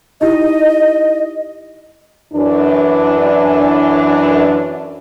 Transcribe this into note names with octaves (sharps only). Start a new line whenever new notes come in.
D#4 E4 G4 D#5
F#2 E3 D4